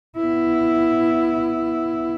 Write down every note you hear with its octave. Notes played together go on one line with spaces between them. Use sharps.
B3 E4